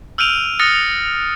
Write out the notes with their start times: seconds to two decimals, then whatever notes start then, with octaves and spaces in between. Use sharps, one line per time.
0.18 E6 F6 G6 D7 D#7 F7
0.59 D#6 F6 F#6 A6 A#6 C#7